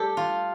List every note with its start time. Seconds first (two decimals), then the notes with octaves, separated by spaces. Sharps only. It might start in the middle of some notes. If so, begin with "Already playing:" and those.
Already playing: G3 G4 A4
0.17 F4